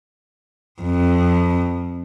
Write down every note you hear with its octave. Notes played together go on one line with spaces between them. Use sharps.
F2